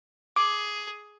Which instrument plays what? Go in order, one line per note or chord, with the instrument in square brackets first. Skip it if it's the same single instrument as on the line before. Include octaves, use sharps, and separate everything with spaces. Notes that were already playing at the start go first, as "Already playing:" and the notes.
[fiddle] G#4 [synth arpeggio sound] D6